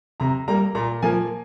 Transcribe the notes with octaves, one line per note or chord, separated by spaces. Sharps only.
C3 A#5
G3 A#3 A#5
A#2 A#5
F3 A#3 G#5